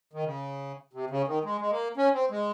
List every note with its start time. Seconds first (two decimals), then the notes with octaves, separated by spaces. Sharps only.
0.13 D#3
0.24 C#3
0.93 C3
1.10 C#3
1.27 D#3
1.44 G#3
1.61 G#3
1.70 A#3
1.97 C#4
2.14 C4
2.31 G#3